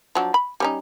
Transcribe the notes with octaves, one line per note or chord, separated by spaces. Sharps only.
F3 F#3 D4
B5
G3 C#4 D#4